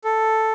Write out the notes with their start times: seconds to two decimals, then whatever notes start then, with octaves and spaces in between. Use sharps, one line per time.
0.04 A4